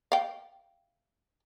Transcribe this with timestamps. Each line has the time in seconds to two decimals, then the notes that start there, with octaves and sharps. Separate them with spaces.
0.12 F5 G5